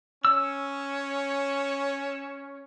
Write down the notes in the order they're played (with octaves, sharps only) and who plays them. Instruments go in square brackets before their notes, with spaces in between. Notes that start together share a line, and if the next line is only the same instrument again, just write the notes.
[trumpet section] C#4 C#5 [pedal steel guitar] E6